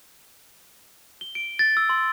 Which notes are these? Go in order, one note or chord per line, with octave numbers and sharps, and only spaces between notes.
G7
D7
A6
E6
C6